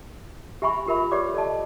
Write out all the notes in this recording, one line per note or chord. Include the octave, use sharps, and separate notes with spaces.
G4 E5 G#5 B5 C#6
F4 G4 A#4 E5 B5
E5
G4 B4 C#5 D5 D6
A4 D5 D#5 A5